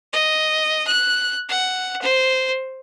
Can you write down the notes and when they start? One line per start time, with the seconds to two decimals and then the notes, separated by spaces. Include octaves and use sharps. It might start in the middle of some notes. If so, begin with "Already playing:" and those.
0.13 D#5
0.87 F#6
1.49 F#5
2.02 C5